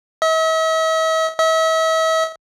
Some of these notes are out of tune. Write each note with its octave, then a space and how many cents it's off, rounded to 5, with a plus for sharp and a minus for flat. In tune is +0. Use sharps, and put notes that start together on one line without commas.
E5 -45
E5 -40